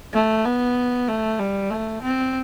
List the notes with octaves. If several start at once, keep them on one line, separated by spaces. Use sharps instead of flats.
A3
B3
A3
G3
A3
C4